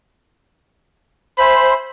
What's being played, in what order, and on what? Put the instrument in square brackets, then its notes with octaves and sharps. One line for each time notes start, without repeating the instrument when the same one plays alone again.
[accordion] C5 [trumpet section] E5 G#5 B5